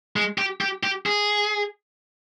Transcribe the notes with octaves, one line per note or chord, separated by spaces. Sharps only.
G#3
G4
G4
G4
G#4